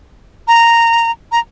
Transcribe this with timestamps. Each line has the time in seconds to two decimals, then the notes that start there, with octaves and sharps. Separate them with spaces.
0.47 A#5
1.32 A#5